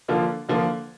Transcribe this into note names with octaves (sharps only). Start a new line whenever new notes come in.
D3 F3 A#3 F4
D3 F3 A#3 F4